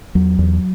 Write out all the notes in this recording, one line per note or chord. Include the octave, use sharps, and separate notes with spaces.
E2 F#3
E2